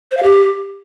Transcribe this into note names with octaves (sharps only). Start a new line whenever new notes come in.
C5
F5
G4